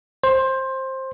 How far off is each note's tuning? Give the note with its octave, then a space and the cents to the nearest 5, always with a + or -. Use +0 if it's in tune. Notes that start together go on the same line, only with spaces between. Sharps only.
C5 +15